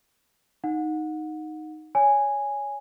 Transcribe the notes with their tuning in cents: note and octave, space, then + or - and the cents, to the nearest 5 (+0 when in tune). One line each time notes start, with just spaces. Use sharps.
D#4 +0 F#5 -25
C#5 +25 G#5 -5